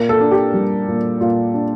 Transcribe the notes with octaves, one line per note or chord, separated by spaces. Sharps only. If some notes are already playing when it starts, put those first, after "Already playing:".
Already playing: A#2 A#4
A4
D4
G4
G3
A#2
A#2 F4
D4